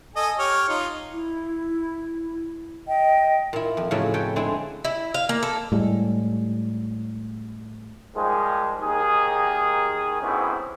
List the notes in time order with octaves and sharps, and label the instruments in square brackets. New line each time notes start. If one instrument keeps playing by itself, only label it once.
[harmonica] A4 D#5 G#5
G4 C#5 F6
D#4 F4
[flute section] E4
D#5 G5
[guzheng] A#2 E4
F2
F2 A2 C#3 F#3 C#5 E5
A4 B4 C#5 G5
D3 G#3 C4 E4
[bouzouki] E4
F5
A#3
A4
[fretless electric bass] A2 G3 G#3
[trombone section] D#3 F3 G3 G#3
D#2 D#3 G#4
D2 G#2 C3 B3 C#4 E4